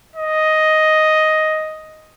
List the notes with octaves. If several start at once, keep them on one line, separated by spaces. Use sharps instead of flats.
D#5